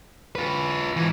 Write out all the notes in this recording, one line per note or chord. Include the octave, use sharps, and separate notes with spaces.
F4 B4
G#2 E3